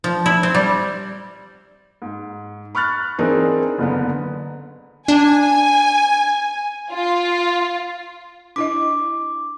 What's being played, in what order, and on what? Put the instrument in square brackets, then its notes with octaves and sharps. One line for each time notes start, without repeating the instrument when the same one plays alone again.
[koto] F3
E4
C4
G3
[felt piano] G#2
B5 C#6 F6 F#6 A6
E3 C4 D4 D#4 G#4 A#4
F#1 D3 B3
[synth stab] D4 [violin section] G#5
[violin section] F4
[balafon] D4 E4 D#5 [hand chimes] D6